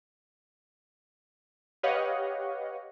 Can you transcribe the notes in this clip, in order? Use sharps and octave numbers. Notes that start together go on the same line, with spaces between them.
G4 B4 C#5 D#5 F5 F#5